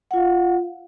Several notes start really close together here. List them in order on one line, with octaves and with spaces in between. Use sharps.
F#5 F4 F5